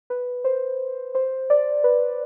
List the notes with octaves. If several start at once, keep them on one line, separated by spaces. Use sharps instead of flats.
B4
C5
C5
D5
B4